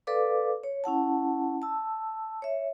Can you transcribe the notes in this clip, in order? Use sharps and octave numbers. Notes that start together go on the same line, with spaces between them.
A4 B4 D5 F5 D6
C#5
C#4 E4 F#5 A5
A5 E6
C#5 E5